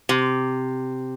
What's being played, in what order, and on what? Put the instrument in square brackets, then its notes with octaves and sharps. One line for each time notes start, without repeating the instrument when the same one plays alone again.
[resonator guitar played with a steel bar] C3